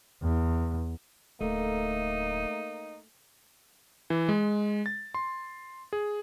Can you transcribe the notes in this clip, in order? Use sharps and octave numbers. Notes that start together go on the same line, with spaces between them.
E2
D1 A3 A#3 D#4
E3
G#3
A6
C6
G#4